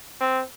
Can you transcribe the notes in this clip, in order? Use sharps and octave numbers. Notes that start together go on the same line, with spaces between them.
C4